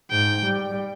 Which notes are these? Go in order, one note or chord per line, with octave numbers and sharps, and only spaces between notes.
G#2 G5
G3